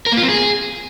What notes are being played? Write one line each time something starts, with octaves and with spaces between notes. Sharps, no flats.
A#4
A#3
F4
C4
G#4